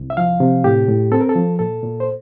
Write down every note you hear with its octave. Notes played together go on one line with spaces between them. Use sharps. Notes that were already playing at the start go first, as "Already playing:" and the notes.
Already playing: C2
E5
F3 F5
C3
A2 G4
A2
C4 A4
A#4
A4
F3
A#2 A4
A#2
C5